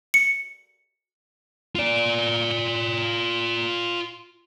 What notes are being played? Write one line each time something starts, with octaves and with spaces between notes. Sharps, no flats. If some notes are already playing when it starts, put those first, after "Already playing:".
C#7
F4 D5